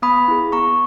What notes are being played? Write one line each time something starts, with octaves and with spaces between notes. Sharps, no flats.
B3 B5 D#6
E4 G#4
B3 A#5 C#6